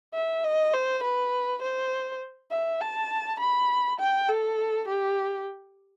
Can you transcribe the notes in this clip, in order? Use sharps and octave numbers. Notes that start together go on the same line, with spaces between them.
E5
D#5
C5
B4
C5
E5
A5
B5
G5
A4
G4